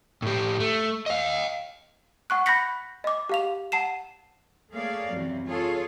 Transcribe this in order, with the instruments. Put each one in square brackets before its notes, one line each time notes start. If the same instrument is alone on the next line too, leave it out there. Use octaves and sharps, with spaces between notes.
[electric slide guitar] A2 G4
A3
D#5 F5
[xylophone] F#5 C#6 F#6
B5 F#6 G6 A#6 B6 C#7
D#5 D6
G4 F5 F7
F#5 A5 C7 E7
[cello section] A3 A#3 G#4 C#5 D5 F5
F#2 C3 E3 F#3
F4 G#4 A4 C#5